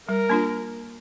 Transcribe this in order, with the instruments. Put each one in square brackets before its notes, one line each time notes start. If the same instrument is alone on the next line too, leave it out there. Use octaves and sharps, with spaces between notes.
[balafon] G3 [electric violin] A#4
[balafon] A#3 D4 F4